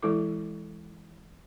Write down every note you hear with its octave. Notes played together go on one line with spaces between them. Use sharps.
E3 G#3 E4 A4 D6